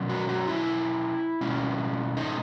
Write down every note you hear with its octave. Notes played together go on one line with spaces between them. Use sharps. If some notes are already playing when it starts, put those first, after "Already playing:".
Already playing: B2 F#3 C#4
F#4
F#4
E4
B2 G#3 C#4
D#4